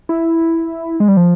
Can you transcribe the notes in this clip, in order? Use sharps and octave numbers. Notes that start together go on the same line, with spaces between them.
E4
G#3
G3
F3